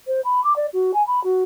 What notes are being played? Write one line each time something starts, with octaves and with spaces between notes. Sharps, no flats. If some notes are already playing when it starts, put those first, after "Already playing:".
C5
B5
D6
D5
F#4
G#5
B5
F#4